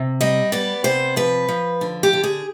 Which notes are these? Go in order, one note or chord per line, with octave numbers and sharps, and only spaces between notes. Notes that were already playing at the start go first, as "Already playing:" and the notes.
Already playing: C3
G3 D#5
B3 D5
C3 C5
F3 B4
F3
D3
G4
D3
G#4